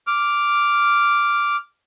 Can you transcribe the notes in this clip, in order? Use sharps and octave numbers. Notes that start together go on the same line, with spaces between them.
D6 F6